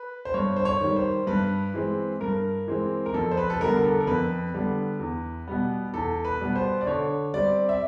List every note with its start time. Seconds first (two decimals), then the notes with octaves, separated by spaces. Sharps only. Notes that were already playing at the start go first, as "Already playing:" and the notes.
Already playing: B4
0.25 C5
0.34 G2 C#5
0.56 C5
0.65 C#5
0.81 D#3 G3
0.96 C5
1.27 G2 B4
1.74 E3 G#3 C4
2.20 G2 A#4
2.68 E3 G#3 C4
3.06 A#4
3.14 F2 A4
3.31 C5
3.37 B4
3.50 A4
3.61 D3 G3 B3 A#4
3.77 A#4
3.84 A4
4.00 A#4
4.07 F2 B4
4.54 D3 G3 B3
5.00 E2
5.48 B2 G3 B3
5.94 E2 A4
6.25 B4
6.40 B2 G3 B3
6.56 C5
6.81 D5
6.87 D3 C#5
7.34 G3 C4 D5
7.69 E5